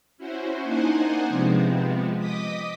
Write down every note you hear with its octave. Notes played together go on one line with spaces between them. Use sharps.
C#4 E4 F#4 C5
A#3 D4 D#4 C5 F#5 G#5
C3 F3 G#3 B3 C4
D#5 D6 D#6 B6